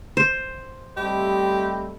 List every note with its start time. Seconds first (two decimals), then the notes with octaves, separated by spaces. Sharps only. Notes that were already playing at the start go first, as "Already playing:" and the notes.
0.17 C5
0.97 G3 A3 C4 G4 D#5 B5